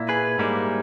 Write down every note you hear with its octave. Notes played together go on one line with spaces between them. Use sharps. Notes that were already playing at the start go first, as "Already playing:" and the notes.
Already playing: A#2 A#3 E4
G#4 B4
G#2 G3 A#3 E4